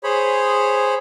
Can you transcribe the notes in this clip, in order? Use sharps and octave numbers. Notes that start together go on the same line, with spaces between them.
G#4 C5 C#5 B5